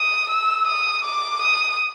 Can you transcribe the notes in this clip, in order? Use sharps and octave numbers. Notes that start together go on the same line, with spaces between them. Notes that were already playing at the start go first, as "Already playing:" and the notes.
Already playing: D#6
E6
D#6
D6
D#6